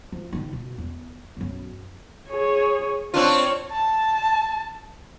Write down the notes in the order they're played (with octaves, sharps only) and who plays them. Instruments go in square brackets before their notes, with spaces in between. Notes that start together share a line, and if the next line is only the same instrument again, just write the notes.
[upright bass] F3
D#3 D#4
B2
E2
B1 F#2
[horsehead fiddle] G#4 C#5
[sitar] C4 D4 F4 [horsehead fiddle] C#5
[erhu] A5